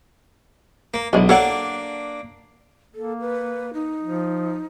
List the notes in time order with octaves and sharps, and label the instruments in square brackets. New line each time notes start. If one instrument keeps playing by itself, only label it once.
[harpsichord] A#3
[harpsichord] B1 [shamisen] G#3 D4 E4
[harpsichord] A#3 D4 [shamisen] A4 C#5 F#5
[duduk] A#3 [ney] A4
[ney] B4
D#4
[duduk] F3